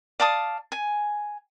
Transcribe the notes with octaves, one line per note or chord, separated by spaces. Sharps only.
D5 F5 A5 D#6
G#5